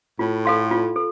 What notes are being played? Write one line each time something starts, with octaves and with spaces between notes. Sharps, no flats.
A2 F4
A4 F5 C6
F4
A4